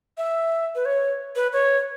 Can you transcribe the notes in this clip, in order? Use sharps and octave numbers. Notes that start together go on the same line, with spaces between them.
E5
B4
C#5
B4
C#5